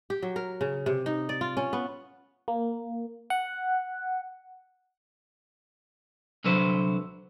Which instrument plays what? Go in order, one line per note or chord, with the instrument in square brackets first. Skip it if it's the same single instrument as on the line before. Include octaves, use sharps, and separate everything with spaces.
[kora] G4
F#3
A#4
C#3
C3
D#4
D5
F4
C#4
B3
[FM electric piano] A#3
F#5
[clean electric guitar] C2 D3 F#3 B4 C5